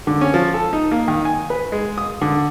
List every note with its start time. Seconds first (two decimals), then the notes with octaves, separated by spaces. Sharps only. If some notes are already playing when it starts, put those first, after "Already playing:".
0.07 D3
0.21 C#4
0.34 F3
0.54 A4
0.73 D#4
0.91 A#3
1.08 D#3
1.25 G#5
1.50 B4
1.72 G#3
1.98 D#6
2.22 D3